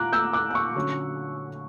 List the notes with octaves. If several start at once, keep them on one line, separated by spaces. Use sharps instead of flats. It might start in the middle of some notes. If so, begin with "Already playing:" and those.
Already playing: A#2 A#5 D6 F#6
E6 G6
D6 F#6
F#6
C#6 E6
D3 F#3 C#4